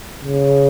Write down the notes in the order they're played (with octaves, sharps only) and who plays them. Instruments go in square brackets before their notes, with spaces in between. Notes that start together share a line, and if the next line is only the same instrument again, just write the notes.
[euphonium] C#3